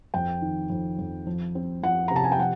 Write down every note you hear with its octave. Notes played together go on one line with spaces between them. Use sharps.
F2 G5
D#3
F2
F2
F3
C4
F3 F#5
C3 A#5
A5
G#5
G5
F3 F#5